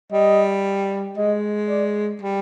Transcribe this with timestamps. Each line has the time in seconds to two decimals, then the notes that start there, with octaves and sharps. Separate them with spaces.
0.12 G3 D#5
1.17 G#3 D#5
1.69 D5
2.22 G3